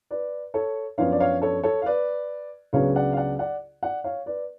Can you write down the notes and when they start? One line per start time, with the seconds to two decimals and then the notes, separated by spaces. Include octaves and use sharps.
0.11 B4 D5
0.54 A4 C#5
0.98 F#2 F3 B3 D4 C#5 F5
1.12 D5
1.20 C#5 F5
1.41 A4 C#5
1.63 A4 C#5
1.82 F5
1.86 B4 D5
2.73 C#2 C#3 F#3 B3 D4 C#5 F5
2.95 D5 F#5
3.13 F5
3.17 D5 F#5
3.39 D5 F#5
3.83 D5 F#5
4.04 C#5 F5
4.26 B4 D5